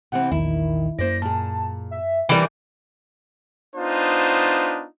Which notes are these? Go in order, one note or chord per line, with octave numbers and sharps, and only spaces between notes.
C3 E3 C4 F#5
A#1 E2 D#3 E4
F#2 A#3 C5 D5 A#6
A#2 G#4 A5
E5
E3 G3 D4 E4 A#4 D6
B3 D4 D#4 F4 C5